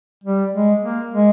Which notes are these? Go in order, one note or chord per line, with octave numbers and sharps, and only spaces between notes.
G3
G#3
A#3
G#3